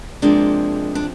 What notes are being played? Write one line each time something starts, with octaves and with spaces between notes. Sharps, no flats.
C3 F3 G#3 A#3 D4
D4